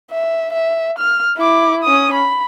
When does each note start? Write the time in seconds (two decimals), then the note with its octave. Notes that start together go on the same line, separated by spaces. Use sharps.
0.11 E5
0.53 E5
0.99 F6
1.37 E4 D6
1.84 C#4 D#6
2.14 B5